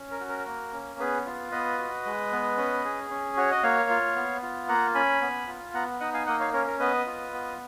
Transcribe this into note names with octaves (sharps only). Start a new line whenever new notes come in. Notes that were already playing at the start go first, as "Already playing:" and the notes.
Already playing: C#4
A#4
F#4
A#4
A#3
C#4
B3 G#4 B4
F4
B3 B4 D#5
F#4
G#3
B3
C#4
G#4
C#4
F#4 C#5
D#5
A#3 C#5 F5
F4
B3
F4
A#3 F#5 A#5
C#4 G#5 B5
B3
F4
B3 F#5 A#5
D#4 D#5 F#5
F5 G#5
A#3 D#5 F#5
C#5 F5
C#4 A#4 C#5
A#4
B3 B4 D#5
F4
B3